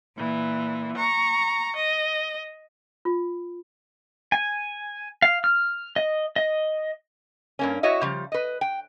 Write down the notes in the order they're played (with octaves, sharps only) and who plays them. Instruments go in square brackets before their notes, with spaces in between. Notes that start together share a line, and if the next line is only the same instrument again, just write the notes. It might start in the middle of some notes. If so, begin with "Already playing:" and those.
[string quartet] A#2 E3
A#5 C#6
D#5
[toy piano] F4
[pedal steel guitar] G#5
F5
F6
D#5
D#5
[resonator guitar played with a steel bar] G2 A#3 C#4
E4 F#4 C#5 D#5 E5
C#3 F3 G3
B4 D#5
G5